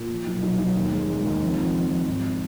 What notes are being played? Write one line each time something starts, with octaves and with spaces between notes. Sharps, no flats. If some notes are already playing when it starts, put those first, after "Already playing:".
Already playing: A#2
F3
B1
B1
B1
D#2
G#3
G#3
D#2
F2
F2
F2
F2
G#1